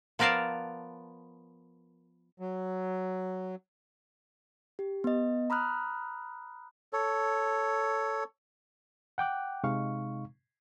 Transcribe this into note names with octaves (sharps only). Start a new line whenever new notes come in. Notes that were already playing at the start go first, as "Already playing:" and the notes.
F3 B3 A#4 D5 F5 A5
F#3
G4
B3 D#5
A#5 B5 D#6 F6 F#6
A4 C#5
F#5 G5 D6 F#6
C3 G#3 D#4 F5 C#6